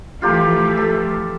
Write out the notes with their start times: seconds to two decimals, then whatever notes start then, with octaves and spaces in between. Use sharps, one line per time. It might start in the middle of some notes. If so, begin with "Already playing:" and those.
0.22 E3 F3 A3 F4 G4 A#5
0.77 A4